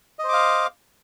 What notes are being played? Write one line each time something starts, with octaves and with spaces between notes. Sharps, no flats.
C5 D#5 F5 D6